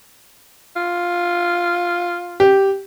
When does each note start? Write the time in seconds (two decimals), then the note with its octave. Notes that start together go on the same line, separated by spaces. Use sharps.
0.76 F4
2.40 G4